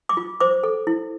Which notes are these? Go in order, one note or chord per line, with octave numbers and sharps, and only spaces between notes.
D6
F4
C5 D6
A4
E4